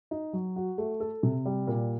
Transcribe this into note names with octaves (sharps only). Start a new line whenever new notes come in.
D#4
F#3
F#4
A3
A4
C3
G3
A#2